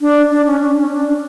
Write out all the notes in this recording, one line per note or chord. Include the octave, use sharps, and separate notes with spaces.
D4
D4
C#4
D4
C#4
D4